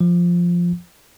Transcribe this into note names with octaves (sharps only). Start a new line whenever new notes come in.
F3